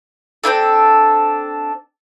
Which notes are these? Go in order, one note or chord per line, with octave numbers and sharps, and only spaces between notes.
C4 D4 E4 A4